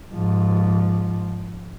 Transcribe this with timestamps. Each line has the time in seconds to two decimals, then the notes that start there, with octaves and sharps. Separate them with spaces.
0.14 G#2 F3